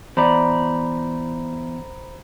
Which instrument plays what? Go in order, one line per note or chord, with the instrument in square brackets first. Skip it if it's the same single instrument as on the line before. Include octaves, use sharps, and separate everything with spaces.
[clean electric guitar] E2 D5 [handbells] C5 A#5 B5